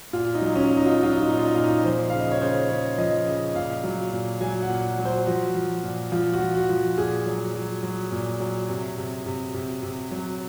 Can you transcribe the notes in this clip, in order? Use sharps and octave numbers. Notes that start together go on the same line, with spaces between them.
A#2 F4
D#4
F#3
C#4
F#3
D#4
F4
D#4
F#3 F4
D#4
F4
A#2 D#4
F4
D#4
A#2 F4
D#4
F3 C5
C#3 F5
D#5
C#5
C#3 C5
C#3 C#5
F3 D#5
C#3 D#5
A#2 F5
F#3
A#2
F#3 G#5
F#5
A#2
F#3
C5
F3 F#4
F3
A#2
F3 F4
F#4
F3
F#4
F3
A#2 G#4
F#3
F#3
F#3
A#2
F#3
C3
C3
C3
C3
C3
F#3